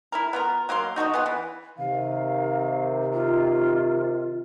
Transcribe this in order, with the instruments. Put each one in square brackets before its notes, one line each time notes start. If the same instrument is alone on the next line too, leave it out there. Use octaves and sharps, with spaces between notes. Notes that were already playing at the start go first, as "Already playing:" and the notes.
[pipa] E4 A4 A#4
B3 F4 A#4
F#3 A#3 F5 C6
D#4 F#4 A4 D#5
B3 F4 G#4 F#5
E3
[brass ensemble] C3 D#3 [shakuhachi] F5
[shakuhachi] F4